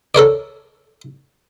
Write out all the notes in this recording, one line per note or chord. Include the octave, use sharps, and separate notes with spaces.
A4 A#4 C#5 D5